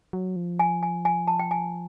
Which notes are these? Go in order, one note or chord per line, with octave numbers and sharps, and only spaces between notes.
F#3
F3
G#5
G#5
G#5
A5
G5
G#5